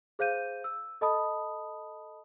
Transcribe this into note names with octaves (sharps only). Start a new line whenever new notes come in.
G#4 C5 F5 G6 D#7
E6
A4 D#5 A5 B5 D#6